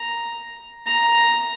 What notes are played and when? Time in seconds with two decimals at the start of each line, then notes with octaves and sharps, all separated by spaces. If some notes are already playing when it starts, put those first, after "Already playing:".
Already playing: A#5
0.86 A#5